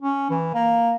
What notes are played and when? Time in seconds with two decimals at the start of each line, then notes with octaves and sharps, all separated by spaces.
0.02 C#4
0.30 E3
0.54 A#3